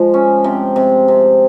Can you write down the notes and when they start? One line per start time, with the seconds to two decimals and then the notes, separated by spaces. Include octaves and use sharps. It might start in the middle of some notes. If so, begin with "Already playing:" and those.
Already playing: F3 G#3
0.14 C#4
0.44 C3
0.76 C3
1.08 C3